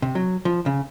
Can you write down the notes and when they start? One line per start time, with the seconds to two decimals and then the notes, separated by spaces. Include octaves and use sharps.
0.02 C3
0.15 F#3
0.45 F3
0.66 C#3